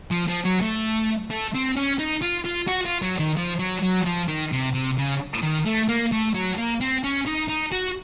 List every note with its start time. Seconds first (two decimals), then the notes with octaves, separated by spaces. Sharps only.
0.11 F3
0.28 F3
0.45 F#3
0.62 A3
1.30 A3
1.54 C4
1.76 C#4
1.99 D#4
2.22 F4
2.45 F4
2.68 F#4
2.85 F4
3.02 F#3
3.19 D#3
3.37 F3
3.59 F#3
3.83 F#3
4.06 F3
4.28 D#3
4.52 C3
4.74 C3
4.98 C#3
5.43 D#3
5.66 A3
5.89 A#3
6.12 A3
6.34 F#3
6.58 A#3
6.81 C4
7.04 C#4
7.27 D#4
7.49 D#4
7.72 F#4